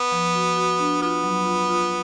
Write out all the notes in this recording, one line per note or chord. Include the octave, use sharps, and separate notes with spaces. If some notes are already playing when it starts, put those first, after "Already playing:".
Already playing: B3
F3
F#4
F#4
D4
B3 F4
F#3
F4
F4